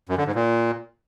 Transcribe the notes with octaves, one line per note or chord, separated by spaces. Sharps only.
F#2
D3
G#2
A#2